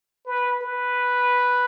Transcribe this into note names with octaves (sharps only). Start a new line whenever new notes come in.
B4
B4